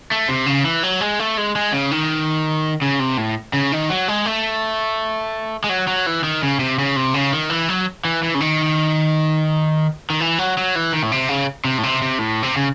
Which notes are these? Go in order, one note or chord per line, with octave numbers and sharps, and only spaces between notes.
A3
C3
C#3
E3
F#3
G#3
A3
G#3
G#3
C#3
D#3
C#3
C3
A2
C#3
D#3
F#3
G#3
A3
G#3
F#3
F#3
E3
D#3
C#3
C3
C#3
C3
C#3
D#3
E3
F#3
E3
E3
C#3
D#3
D#3
E3
F#3
F#3
E3
D#3
A2
C3
C#3
C3
A2
C3
C3
A2
C3
C#3